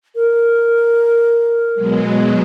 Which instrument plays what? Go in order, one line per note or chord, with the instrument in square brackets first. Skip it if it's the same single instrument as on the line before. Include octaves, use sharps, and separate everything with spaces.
[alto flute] A#4
[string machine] B2 F#3 G#3